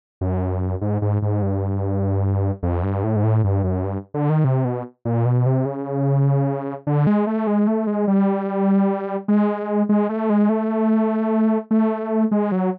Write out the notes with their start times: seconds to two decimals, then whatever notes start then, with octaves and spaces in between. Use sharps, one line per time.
0.21 F#2
0.81 G#2
1.02 G#2
1.22 G#2
1.42 G2
2.63 F2
2.83 G2
3.04 A2
3.16 G#2
3.24 A2
3.44 G2
3.64 F#2
3.84 G2
4.14 D3
4.30 D#3
4.44 C3
4.65 B2
5.05 A#2
5.26 B2
5.46 C3
5.65 C#3
6.87 D3
7.07 G#3
7.27 A3
7.47 G#3
7.67 A3
7.87 G#3
8.08 G3
9.28 G#3
9.89 G#3
10.09 A3
10.30 G#3
10.49 A3
11.71 A3
12.31 G#3
12.52 F#3